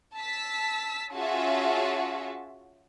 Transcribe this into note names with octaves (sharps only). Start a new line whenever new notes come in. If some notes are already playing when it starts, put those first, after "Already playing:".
A5 E6 B6
C#4 F4 F#4 G#4 E5 A5